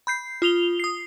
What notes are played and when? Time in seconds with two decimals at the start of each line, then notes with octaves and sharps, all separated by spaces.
0.07 B5 G6 C7
0.42 F4 D#6 F7 G7
0.80 D#6 C7